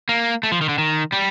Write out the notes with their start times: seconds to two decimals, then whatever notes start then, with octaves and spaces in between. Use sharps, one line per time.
0.09 A#3
0.43 A3
0.52 F3
0.61 D#3
0.69 D3
0.78 D#3
1.12 G3